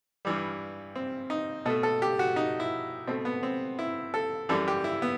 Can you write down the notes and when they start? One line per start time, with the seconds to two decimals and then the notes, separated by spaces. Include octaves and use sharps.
0.25 G2 E3 G3
0.96 C4
1.30 D#4
1.66 B2 A4
1.70 A3
1.83 A4
2.02 G4
2.19 F#4
2.36 D#4
2.60 E4
3.07 B2 A3 C4
3.25 B3
3.43 C4
3.79 E4
4.14 A4
4.49 F#2 E3 G3 A4
4.68 G4
4.84 E4
5.02 B3